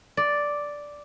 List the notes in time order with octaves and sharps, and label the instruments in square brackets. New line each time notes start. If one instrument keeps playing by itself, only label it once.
[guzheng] D5